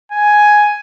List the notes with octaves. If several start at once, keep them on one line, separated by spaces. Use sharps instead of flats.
G#5